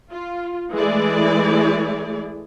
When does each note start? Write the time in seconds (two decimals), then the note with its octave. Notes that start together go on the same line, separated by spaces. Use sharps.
0.11 F4
0.74 E3 G#3 A3 E4 G#4 D5